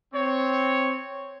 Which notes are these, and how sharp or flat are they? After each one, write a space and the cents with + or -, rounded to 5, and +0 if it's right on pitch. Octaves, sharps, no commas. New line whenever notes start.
C4 +0 C#5 +0